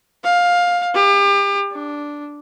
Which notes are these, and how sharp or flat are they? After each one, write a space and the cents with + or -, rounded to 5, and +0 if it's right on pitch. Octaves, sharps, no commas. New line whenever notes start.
F5 +15
G4 +35
D4 -5